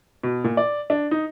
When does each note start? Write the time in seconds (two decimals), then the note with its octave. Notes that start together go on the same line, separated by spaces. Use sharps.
0.23 B2
0.44 A#2
0.57 D5
0.90 D4
1.11 D#4